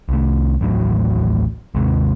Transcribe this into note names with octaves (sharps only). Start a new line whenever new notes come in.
C2 A3
A1 D#2 A2 F#3
G#1 D#2 C3 G#3